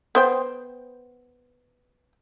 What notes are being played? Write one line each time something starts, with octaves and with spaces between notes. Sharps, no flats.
B3 C5 G5